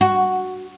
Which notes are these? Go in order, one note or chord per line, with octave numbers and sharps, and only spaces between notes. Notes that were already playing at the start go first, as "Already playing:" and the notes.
F#4